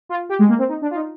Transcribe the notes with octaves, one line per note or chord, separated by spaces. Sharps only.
F4
G4
G#3
A#3
C4
D#4
D4
F4
D#4